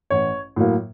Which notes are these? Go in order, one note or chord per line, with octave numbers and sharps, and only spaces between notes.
A1 C#5
A2 F#3 A#3